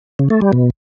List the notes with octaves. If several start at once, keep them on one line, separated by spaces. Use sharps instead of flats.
C#3
A3
G3
B2